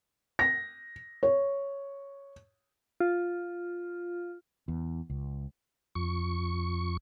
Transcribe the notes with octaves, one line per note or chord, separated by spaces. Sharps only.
A#6
C#5
F4
E2
C#2
F2 C#6